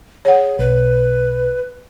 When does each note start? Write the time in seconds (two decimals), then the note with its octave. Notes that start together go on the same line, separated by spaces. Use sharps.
0.25 G#4 C#5 F#5
0.59 B1 B4